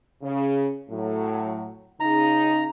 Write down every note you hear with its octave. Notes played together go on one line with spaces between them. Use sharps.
C#3
A2 F#3
C#3 D#4 A#5